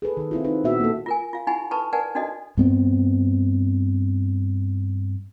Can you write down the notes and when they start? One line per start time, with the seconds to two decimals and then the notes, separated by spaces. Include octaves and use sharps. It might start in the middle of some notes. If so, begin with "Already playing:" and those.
0.02 G#4 A4 B4
0.17 D#3 B4
0.31 C4 E4 F4
0.44 C4 D#4 B4
0.64 A#2 B3 F#4 E5
0.80 A#3 A4
1.06 F4 A#4 G#5
1.33 F4 F5
1.47 D#4 E4 G4 F#5 G#5 B5
1.71 D#4 A4 B4 A5 B5 C#6
1.93 A#4 B4 D5 F#5 G#5 A5
2.15 D4 D#4 F#4 A4 D5 D#5
2.57 G2 B3 C4